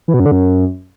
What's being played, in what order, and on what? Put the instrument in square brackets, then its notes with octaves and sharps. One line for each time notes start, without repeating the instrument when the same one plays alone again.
[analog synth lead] E3
B2
F#2
D3
F#2